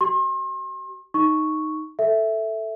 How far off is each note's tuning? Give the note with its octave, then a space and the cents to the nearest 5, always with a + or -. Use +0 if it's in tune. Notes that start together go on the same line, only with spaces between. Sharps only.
F#4 +45 C6 +40
D#4 +0 C#6 +0
A4 +0 E5 +0